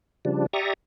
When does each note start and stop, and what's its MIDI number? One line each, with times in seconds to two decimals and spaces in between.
0.25 0.46 49
0.25 0.46 53
0.25 0.46 55
0.25 0.46 62
0.53 0.73 67
0.53 0.73 74
0.53 0.73 76
0.53 0.73 82
0.53 0.73 85
0.53 0.73 87